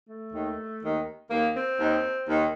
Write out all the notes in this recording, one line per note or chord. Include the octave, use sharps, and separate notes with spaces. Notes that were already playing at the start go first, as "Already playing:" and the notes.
A3
D#2 D#3
D#2 D#3
D#2 D#3 A#3
C4
D#2 D#3
D#2 D#3